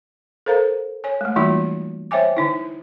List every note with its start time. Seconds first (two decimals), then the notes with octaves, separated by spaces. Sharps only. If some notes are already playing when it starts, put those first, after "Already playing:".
0.46 A4 A#4 C5 F5 A#5
1.04 C#5 G#5
1.21 G#3 A3
1.36 E3 G3 A#3 D#4 F4 F#4
2.11 C5 C#5 E5 G5 G#5 D6
2.37 D3 D#4 E4